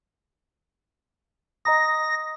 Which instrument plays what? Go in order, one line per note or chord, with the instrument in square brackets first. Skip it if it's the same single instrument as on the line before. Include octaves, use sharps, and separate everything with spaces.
[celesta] D#5 A#5 D#6 [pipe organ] A#6